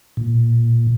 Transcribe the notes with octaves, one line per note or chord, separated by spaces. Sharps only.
A#2